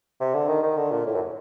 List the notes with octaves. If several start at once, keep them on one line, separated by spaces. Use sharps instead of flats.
C3
D3
D#3
D#3
D3
A#2
A2
F#2